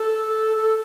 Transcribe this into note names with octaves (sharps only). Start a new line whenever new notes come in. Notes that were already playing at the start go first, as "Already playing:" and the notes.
Already playing: A4
A4